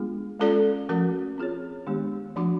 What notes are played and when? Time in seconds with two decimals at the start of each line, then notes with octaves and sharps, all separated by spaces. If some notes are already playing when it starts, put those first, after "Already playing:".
Already playing: G#3 B3 D4 F4 G#4
0.39 G#3 C#4 F4 A4 D5
0.89 F3 A3 C#4 F#4 A#4
1.38 C4 F4 G#4 C#5
1.87 D#3 G#3 B3 D4 G4
2.36 F3 A3 D4 F#4